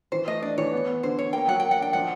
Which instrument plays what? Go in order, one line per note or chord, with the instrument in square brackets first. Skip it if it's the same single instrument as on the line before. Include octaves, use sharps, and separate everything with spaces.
[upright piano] E3 [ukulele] C5
[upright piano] A3 [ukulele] D#5
[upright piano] D4 [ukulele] D5
[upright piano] E3 [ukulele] C#5
[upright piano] B3
B3
[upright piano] D3 [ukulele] C5
[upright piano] D3 [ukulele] C#5
[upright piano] A#3 [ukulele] G5
[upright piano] F#3 [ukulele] F#5
[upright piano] A#3 [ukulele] G5
[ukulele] F#5
[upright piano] D4 [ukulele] G5
[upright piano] F3 [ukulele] F#5